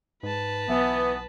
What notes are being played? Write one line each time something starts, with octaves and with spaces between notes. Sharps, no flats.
G#2 B4 A5
B1 E3 B3